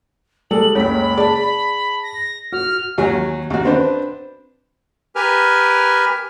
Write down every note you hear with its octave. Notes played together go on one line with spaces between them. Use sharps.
G3 G#3 A4 F#7
F#1 C#2 C#5 B5 B6
G#4 D5 A5
A#6
F#4 F6
D#2 F#3 G#5
D#2 F#4
C4 D4 B4 C5
G4 A#4 B4 G#5 F6